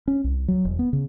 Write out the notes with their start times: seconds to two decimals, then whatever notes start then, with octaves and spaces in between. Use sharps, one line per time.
0.08 C#4
0.24 C2
0.48 F#3
0.65 E1
0.79 B3
0.93 C#3